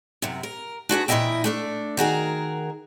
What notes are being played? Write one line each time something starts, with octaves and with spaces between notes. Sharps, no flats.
F#2 C3
A#4
D4 F#4 G#4 B4
A#2 E3 E4 D#5 E5 G5
A3 D4 A4
D#3 F#4 G#4 A#4